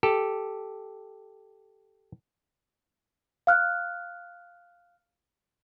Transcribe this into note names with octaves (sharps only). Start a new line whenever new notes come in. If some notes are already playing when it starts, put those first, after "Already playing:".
G4 A4
F5 F6 F#6